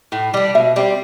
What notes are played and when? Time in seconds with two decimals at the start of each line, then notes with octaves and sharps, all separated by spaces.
0.12 A2
0.34 G3 D4
0.55 B2 E5
0.76 G3 C4